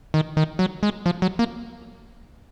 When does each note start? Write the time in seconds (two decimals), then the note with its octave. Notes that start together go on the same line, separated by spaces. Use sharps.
0.14 D#3
0.37 D#3
0.59 F#3
0.83 G#3
1.06 F3
1.22 F#3
1.39 A#3